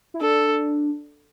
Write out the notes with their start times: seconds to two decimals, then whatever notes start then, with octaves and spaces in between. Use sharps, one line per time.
0.14 E4
0.21 D4 A4